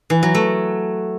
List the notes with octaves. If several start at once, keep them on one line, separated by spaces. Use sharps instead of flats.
E3
F#3
A3